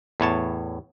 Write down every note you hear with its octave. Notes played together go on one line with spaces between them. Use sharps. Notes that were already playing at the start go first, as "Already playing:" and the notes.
E2 A2 C#5 A5